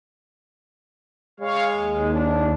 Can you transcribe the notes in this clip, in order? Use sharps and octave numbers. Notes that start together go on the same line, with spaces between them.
G#3 C#5 F5
D#2
D4